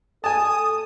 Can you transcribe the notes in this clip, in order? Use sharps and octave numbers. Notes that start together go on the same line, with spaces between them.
A4 G#5 A5 D#6